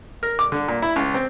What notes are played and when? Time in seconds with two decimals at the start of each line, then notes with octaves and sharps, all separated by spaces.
0.23 A#4
0.39 D6
0.52 D3
0.68 A#2
0.82 E4
0.96 C#2
1.14 C4